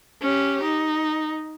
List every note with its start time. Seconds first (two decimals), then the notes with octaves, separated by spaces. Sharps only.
0.22 C#4 G4
0.63 D#4